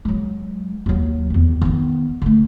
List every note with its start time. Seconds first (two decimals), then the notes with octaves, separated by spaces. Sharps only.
0.05 F#3 G#3
0.86 D#2 F#3
1.30 E2 D#3
1.62 D#3 B3
2.22 D3 A3